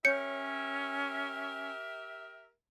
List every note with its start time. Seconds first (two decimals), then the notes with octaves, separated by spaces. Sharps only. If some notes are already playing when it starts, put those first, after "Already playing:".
0.05 C#4 G4 A#4 C#5 E5 G6 C#7